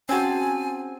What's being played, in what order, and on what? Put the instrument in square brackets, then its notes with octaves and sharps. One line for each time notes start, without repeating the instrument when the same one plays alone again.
[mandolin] C4 G#4 A5 [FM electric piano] C#4 F#4 [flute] G#5